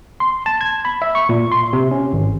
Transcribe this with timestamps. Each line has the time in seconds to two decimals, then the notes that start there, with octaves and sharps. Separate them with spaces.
0.20 C6
0.46 A5
0.61 G#6
0.85 B5
1.02 E5
1.15 C#6
1.29 A#2
1.52 C6
1.73 C3
1.91 C#4
2.13 G#1